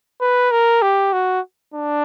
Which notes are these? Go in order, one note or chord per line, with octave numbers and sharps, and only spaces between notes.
B4
A#4
G4
F#4
D4